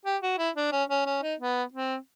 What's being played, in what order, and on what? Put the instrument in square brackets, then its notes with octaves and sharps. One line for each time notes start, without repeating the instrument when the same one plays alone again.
[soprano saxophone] G4
F#4
E4
D4
C#4
C#4
C#4
D#4
B3
C4